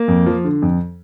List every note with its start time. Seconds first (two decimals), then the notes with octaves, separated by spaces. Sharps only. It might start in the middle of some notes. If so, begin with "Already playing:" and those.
Already playing: A#3
0.08 F2
0.26 F3
0.44 D3
0.62 F2